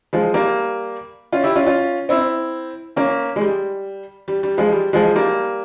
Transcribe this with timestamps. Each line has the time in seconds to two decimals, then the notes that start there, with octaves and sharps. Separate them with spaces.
0.13 F3 G#3
0.34 G3 A#3
1.32 C#4 F4
1.43 E4 G4
1.56 C#4 F4
1.66 C#4 F4
2.09 C4 E4
2.96 A#3 C#4
3.36 G#3
3.41 G3
4.28 G3
4.43 G3
4.57 F3 G#3
4.72 G3
4.93 F3 G#3
5.15 G3 A#3